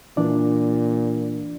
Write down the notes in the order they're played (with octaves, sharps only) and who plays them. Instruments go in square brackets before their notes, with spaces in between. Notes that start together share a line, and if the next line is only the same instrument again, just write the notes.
[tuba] A#2 [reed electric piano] E3 D4 D5